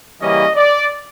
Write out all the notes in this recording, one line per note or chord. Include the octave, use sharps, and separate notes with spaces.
C#3 E3 G3 A#3 C#4 D#5
D5